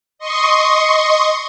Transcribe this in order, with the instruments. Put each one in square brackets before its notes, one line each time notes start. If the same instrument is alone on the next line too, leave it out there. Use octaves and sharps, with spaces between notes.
[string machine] D#5 C6 C#6 D#6